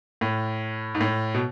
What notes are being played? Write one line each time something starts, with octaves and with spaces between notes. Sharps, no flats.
A2
G#2
A2
B2